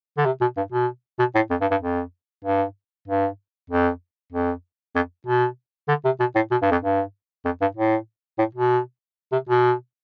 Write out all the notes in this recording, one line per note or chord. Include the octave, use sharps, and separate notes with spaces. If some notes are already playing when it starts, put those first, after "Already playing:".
D3
C3
B2
G2
B2
B2
A2
F2
G2
G2
F2
G2
G2
F2
F2
F2
B2
D3
C3
B2
A2
B2
G2
F2
G2
F2
G2
A2
A2
B2
C3
B2